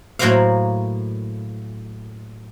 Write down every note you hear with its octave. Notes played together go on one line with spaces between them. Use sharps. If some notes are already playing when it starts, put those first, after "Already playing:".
A2 F#3 A#3 F#4 C5 F5